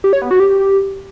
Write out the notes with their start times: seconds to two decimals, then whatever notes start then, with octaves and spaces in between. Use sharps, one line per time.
0.04 G4
0.13 C#5
0.22 B3
0.31 F#4
0.40 G4